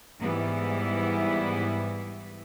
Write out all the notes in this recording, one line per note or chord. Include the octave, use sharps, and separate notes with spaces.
G#2 E3 G3 B3 E4